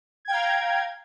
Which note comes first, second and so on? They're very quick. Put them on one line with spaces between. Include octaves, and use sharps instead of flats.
G#6 G5 F5 A#5